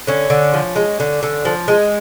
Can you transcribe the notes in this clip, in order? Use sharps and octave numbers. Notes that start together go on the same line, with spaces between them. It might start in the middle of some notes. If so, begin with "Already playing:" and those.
D3 C#4
D3
F3
G#3
D3
D3
F3
G#3